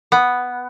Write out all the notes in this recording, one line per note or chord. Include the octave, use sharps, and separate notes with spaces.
B3